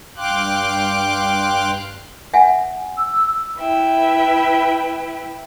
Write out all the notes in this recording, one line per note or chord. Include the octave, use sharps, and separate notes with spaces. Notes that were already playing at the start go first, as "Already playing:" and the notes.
G2 F5 G5 C6 D6 F#6
E5 F#5 G#5
E6
E4 B4 E5 G5